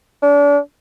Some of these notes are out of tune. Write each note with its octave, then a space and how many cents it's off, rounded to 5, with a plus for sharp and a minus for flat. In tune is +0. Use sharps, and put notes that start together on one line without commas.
D4 -35